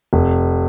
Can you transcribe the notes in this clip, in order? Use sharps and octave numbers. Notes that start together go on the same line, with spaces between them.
F1